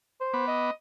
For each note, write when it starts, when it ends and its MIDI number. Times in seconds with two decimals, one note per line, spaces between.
0.21 0.46 72
0.34 0.71 59
0.34 0.71 83
0.34 0.71 86
0.48 0.72 75